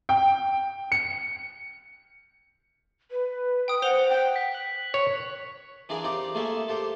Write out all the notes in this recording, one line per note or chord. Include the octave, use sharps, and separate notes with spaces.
G5
C#7
B4
G5 D#6
C5 F#5 F7 G7
G5
B6
F#6 F#7
C#5
E3 D4 F4 G#4 A#4 D5
C4 D#4 F4 G4 D5
A3 A#3 F4 G#4 A4 E5
F4 G4 A4 C5